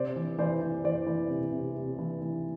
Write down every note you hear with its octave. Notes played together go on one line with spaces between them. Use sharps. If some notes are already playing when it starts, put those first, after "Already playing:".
Already playing: C3 C5 D5
E3
E3 C5 D5
E3
E3 C5 D5
E3
C3
C3
C3
E3
E3